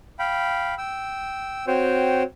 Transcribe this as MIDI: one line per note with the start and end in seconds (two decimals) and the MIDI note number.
0.19 0.75 77
0.19 0.75 79
0.19 0.75 83
0.78 1.65 79
0.78 1.65 88
1.67 2.23 60
1.67 2.23 66
1.67 2.23 72
1.67 2.23 73
1.67 2.23 79